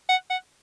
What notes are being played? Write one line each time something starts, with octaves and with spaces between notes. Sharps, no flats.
F#5
F#5